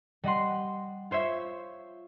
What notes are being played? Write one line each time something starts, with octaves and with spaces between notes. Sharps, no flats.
G3 D#5 F#5 C6
F4 C5 C#5 E5